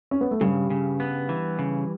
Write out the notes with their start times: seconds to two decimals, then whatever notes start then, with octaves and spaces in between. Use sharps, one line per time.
0.11 C#4
0.21 B3
0.31 A3
0.41 G2 C#3 G3
0.70 C#3
1.00 B3
1.29 E3
1.59 C#3